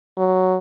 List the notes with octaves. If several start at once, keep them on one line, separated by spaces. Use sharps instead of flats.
F#3